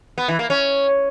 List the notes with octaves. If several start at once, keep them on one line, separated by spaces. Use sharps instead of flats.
B3
E3
A#3
C#4